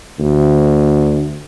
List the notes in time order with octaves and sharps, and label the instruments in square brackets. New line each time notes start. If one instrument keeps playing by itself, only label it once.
[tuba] D2